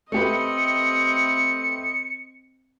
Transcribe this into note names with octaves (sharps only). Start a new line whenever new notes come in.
A3 C4 G4 B4 D#5 C#7